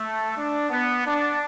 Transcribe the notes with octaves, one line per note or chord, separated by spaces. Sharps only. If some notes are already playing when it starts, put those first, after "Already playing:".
Already playing: A3
D4
B3
D4